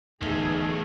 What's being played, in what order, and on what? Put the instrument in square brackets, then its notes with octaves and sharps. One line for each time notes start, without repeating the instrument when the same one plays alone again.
[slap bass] D1 G#1 [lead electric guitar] E2 A3 [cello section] E3 G#4 [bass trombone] D#4